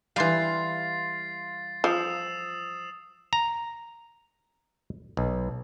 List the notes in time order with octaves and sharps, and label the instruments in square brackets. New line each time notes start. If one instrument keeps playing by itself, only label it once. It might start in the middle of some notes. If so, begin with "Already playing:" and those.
[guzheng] E3 G3 [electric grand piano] F5 C6 [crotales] A6 C7
[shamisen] F3 [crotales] D#6 E6 E7
[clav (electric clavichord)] A#5
B1